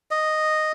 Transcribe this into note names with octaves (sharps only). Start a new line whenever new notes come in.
D#5